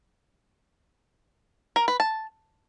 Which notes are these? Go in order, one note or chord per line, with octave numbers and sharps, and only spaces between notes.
A#4
B4
A5